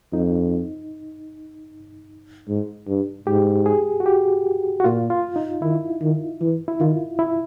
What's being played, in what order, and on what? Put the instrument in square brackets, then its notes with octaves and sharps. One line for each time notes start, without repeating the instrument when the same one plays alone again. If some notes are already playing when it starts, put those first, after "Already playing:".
[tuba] F2 [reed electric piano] D#4
[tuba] G#2
G2
[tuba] G#2 [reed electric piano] G4
[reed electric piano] G#4
F#4
G4
F#4
[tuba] A#2 [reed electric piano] F4
[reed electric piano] F4
D#4
[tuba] D#3 [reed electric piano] E4
[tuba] D#3
E3
[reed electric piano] E4
[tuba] D#3 [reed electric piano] F4
[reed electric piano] E4